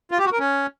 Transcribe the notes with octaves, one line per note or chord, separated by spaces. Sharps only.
F4
G4
F#4
A#4
C#4